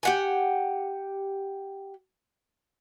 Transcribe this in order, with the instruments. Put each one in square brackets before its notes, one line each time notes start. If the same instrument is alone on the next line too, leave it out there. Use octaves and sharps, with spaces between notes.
[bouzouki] G4 F#5 G#5